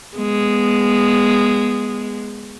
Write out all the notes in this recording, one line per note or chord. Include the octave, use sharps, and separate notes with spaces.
G#3 B3